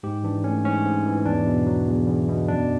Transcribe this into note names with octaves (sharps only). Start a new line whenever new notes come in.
G#2 G4
E3 D4
A3 C#4
G#2 C#4
G#2
E3
E2 D4
B2
F#3
E2
E2
B2
F#2 D4